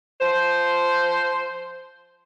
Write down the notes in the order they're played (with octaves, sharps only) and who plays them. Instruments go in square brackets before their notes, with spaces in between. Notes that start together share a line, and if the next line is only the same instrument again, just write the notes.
[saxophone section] F3 C5